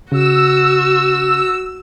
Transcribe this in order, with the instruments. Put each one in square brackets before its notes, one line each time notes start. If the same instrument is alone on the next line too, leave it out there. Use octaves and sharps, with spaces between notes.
[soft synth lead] C#3 [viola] F#4 [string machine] E6